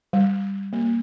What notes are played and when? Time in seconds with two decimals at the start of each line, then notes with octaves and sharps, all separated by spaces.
0.13 G3
0.73 A#3